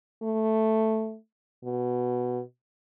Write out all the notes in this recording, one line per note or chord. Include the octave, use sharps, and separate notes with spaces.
A3
B2